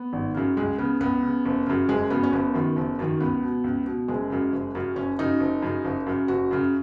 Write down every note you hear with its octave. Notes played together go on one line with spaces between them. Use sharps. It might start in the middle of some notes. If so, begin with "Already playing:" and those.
Already playing: B3
G#1
F#2 C#3
C#2 G#3
C#3 B3
C#2 B3
C#3
F#1
F#2 C#3
F#1 G#3
F#2 C#3 B3
C#4
F#1 B3
F#2 D#3
F#1
F#2 D#3
C#2 B3
B2
C#2
B2
F#1 G#3
F#2 C#3
F#1
F#2 C#3
F#1 C#4
F#2 C#3 D#4
F#1
F#2 C#3
F#1
F#2 C#3
F#1 F#4
F#2 C#3